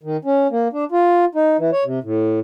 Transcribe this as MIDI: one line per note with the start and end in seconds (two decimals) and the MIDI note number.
0.03 0.17 51
0.25 0.47 61
0.51 0.68 58
0.73 0.84 62
0.92 1.25 65
1.35 1.57 63
1.58 1.70 52
1.73 1.84 73
1.85 1.99 48
2.03 2.40 45